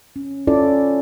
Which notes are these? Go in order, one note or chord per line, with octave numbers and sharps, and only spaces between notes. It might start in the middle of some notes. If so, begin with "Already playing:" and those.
C#4
C#4 E4 F4 A4 D5